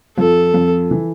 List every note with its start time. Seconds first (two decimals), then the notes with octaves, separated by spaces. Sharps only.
0.18 F2 F3 A4
0.54 F2 F3
0.91 E3